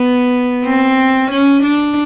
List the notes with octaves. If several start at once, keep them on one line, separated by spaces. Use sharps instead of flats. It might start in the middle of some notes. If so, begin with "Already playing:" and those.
Already playing: B3
C4
C#4
D4